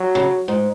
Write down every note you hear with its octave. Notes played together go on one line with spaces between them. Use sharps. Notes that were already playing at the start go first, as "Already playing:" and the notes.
Already playing: F#3
C#3
G#2